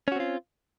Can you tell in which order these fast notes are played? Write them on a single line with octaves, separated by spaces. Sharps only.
C#4 F#4 C4 F4